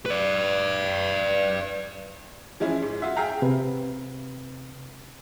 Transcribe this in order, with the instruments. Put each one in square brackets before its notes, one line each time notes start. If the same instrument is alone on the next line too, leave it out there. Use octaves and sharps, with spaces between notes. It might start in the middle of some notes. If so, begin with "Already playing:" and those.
[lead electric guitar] B4 D5
[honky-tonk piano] E3 F3 G#3 C#4 E4
G#2
F4 F#4 E5
G#4 E5 F5 G5 A#5
[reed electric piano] C3 B4